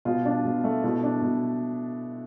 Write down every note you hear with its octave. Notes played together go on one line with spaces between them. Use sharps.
B2 F4
D4
B2
A3
B2 E4
D4
B2